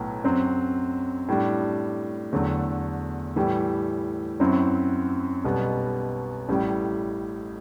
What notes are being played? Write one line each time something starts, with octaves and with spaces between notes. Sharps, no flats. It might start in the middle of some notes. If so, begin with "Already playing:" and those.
Already playing: B1 A2 F#3 B3
F#2 F#3 C4
A2 G3 D4
E2 D3 F#3 A3
A2 E3 G3
F#2 F#3 C4 E4
B1 B2 G3 B3
A1 A2 G3